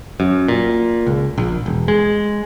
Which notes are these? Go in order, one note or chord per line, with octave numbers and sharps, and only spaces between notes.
F#2
A#2
C#2
A#1
E1
G#3